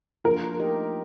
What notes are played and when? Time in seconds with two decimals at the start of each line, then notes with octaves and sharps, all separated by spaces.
0.24 F3 A#3 D4 F4 A#4
0.59 A3 D#4 G4 A#4 D#5